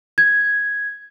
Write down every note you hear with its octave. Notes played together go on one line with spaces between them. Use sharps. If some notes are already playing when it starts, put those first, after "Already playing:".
G#6